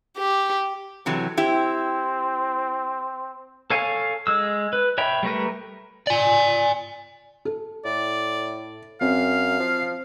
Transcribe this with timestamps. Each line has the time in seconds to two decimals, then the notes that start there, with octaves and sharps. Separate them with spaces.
0.18 G4
1.06 C3 E3 F#3 A4
1.37 C4 E4 G4
3.70 A4 C#5 F5 G#5
4.27 G#3 E6
4.73 B4
4.98 C#5 E5 G5 B5
5.23 G3 A3 A#4 B4
6.07 D5 G#5
7.45 A4
7.85 A2 D5
9.01 F#2 C4 F5
9.60 F3